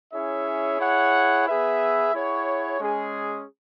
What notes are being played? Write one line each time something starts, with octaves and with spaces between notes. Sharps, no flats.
C#4 E4 G#4 C#5 E5
E4 G#4 C#5 F#5
B3 G#4 B4 E5
E4 G#4 C#5 F#5
G#3 C#4 G#4